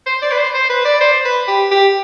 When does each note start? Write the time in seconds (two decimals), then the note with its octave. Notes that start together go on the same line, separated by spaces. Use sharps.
0.07 C5
0.22 D5
0.32 B4
0.38 C5
0.54 C5
0.70 B4
0.85 D5
1.01 C5
1.25 B4
1.48 G4
1.72 G4